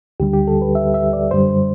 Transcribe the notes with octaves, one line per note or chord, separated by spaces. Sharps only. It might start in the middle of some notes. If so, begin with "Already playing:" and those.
D2 D3 G3 G4
G4
A4
B4
E5
E5
D5
F#2 D3 G3 C5